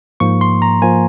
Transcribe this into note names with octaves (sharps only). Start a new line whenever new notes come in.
G#2 F3 A#3 C#6
C6
A#5
F3 A#3 G#5